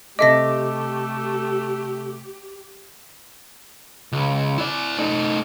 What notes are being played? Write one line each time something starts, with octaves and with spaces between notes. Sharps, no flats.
C3 A3 G4 A4 D#5 E5 D6 A#6
C#2
E4 D5
A3 D#4